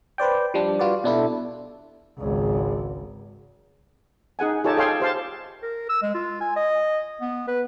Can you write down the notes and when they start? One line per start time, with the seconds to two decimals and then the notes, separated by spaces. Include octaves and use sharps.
0.18 B4 C5 D5 G5
0.54 F3 G3 D4
0.79 G3 F4 F#4 B4 D5
1.04 B2 D4 E4 A4
2.18 G#1 C#2
4.39 D#4 G#4 F#5 G#5
4.64 D#4 F4 G4 A4 C#5 A5
4.77 G#4 A4 C#5 F5 G5 C6
5.00 G4 C5 F5 A5
5.62 A#4
5.89 E6
6.02 G#3
6.14 F4
6.41 G#5
6.56 D#5
7.21 B3
7.48 B4